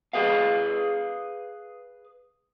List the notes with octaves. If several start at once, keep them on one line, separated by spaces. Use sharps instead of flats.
G#4 B4 F5